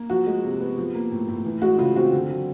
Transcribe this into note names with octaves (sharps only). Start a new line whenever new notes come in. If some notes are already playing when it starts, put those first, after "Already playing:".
Already playing: A#3
F3 F#4
G#3
C3
B3
F3
A#3
A2
A2
E3
G#3 F#4
C#3 F4
C4 F#4
D3
F#3